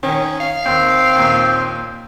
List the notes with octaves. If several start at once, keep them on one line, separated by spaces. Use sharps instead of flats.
D#3 C#4
F5
D#2 C4 G5
D#2 A#2